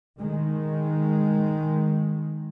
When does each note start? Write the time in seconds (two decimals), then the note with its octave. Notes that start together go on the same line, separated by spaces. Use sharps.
0.17 D#3 G#3